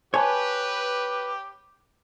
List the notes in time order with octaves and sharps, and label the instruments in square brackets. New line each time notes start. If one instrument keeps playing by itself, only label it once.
[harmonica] G4 [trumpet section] B4 [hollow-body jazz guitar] C#5 [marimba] G#5 A5